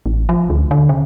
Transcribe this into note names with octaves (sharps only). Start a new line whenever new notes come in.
A1
F3
D2
D3
C#3